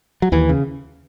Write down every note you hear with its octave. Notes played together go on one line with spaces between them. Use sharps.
F#3
D#2 E3
C#3